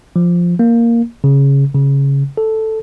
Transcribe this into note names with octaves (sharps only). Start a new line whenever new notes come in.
F3
A#3
C#3
C#3
A4